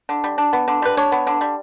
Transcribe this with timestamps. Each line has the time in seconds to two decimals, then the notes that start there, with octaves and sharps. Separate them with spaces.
0.09 D3
0.24 G3
0.38 D4
0.53 B3
0.68 D3
0.82 G3 B4
0.97 D4 C#5
1.12 B3
1.27 D3
1.41 G3